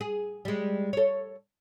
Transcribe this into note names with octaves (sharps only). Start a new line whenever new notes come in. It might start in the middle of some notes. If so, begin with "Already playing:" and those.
G#4
G3 G#3
A4 C#5